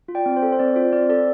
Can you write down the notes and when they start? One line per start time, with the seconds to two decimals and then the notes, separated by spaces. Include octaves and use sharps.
0.08 F4
0.15 D5 G5
0.26 C4
0.36 C5
0.42 A4
0.52 C5
0.59 C4 D5
0.76 F4 C5
0.92 C4 D5
1.09 A4 D5